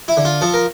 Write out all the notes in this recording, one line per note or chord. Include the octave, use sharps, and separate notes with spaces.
E4
D3
F4
F3 A4
A#4